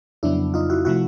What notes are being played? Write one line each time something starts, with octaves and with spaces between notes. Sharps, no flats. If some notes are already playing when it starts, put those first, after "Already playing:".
F2 C#3 F#3 B3 D4 E4
D#4 F4
E4 F#4
C3 F3 A3 E4 F#4